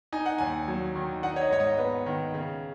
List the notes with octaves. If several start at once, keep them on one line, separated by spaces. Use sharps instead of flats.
D#4 G#5
F#5
D#2 G#5
F#3
D#3
D#4 F#5
C#5
D#5
G#2 C#5
D#5
B3
D#3
C#3